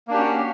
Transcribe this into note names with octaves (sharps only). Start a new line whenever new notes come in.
A#3 C#4 D4 F#4 G4